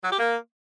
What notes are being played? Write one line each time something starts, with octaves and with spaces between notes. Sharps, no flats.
F#3
G4
A#3